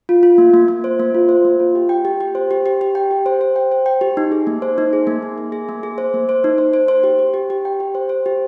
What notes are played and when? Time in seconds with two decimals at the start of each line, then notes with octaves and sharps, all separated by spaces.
0.09 F4
0.23 F4
0.38 A#3
0.54 A#3
0.68 A#3
0.84 C5
1.00 A#3
1.15 F4
1.29 C5
1.45 A#3
1.60 F4
1.75 G4
1.89 G5
2.05 G4
2.20 G4
2.35 C5
2.51 G4
2.66 G4
2.81 G4
2.95 G5
3.11 G4
3.26 C5
3.41 C5
3.56 G5
3.71 C5
3.86 G5
4.01 G4
4.17 D#4
4.32 G#4
4.47 A#3
4.62 C5
4.78 D#4
4.93 G#4
5.07 A#3
5.22 G#4
5.38 A#3
5.52 G#4
5.69 A#3
5.83 G#4
5.98 C5
6.14 A#3
6.29 C5
6.44 D#4
6.58 C5
6.73 C5
6.88 C5
7.03 G4
7.19 G4
7.34 G4
7.50 G4
7.65 G5
7.80 G4
7.95 C5
8.09 C5
8.26 G4